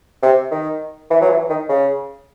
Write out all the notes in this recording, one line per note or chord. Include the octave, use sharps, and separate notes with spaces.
C3
D#3
E3
F#3
E3
D#3
C#3